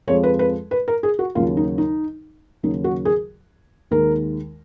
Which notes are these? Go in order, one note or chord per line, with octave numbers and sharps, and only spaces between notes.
F2 F3 G#3 C#5
B4
B4
B4
A#4
G#4
F#4
D#2 C#3 F#3 F4
D#4
D#4
D#2 C#3 F#3 D#4
F#4
G#4
D#2 D#3 G#3 A#4